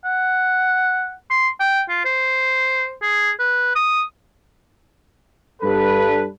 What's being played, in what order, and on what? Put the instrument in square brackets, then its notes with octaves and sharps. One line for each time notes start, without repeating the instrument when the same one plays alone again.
[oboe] F#5
[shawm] C6
G5
F4
C5
G#4
B4
D#6
[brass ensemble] G2 A4 B4